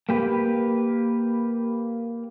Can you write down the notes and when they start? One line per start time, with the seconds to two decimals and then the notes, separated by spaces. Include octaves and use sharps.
0.09 A#3 G4 B4